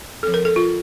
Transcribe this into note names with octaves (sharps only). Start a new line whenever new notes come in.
F3 C4 A4
A#4
A4
F4